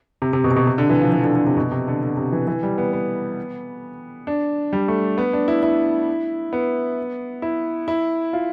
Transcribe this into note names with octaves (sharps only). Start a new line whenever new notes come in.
C3
C3
B2
C3
B2
C3
D3
E3
F3
E3
D3
D3
C3
B2
C3
D3
D3
C3
E3
E3
G3
B3
B3
D4
G3
A3
B3
D4
E4
E4
B3
E4
E4
F4